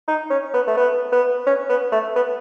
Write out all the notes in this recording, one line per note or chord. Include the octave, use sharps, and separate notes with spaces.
D#4
C#4
B3
A3
B3
B3
C#4
B3
A3
B3